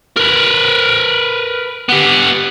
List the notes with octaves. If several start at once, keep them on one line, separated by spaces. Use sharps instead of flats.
A#4 B4
B3 G4